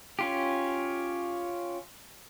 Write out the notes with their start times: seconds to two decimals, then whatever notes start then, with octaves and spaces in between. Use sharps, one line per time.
0.19 C#4 F4 G4